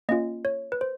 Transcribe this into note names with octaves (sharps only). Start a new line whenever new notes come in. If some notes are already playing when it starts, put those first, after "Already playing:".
A#3 C#4 F4 D#5
C#5
B4
C5